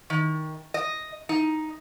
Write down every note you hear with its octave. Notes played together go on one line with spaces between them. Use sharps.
D#3
D#5
D#4